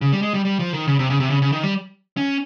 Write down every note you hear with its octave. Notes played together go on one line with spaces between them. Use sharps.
C#3
G3
G#3
G3
G3
F3
D#3
C#3
C3
C#3
C3
C#3
C#3
D#3
G3
C#4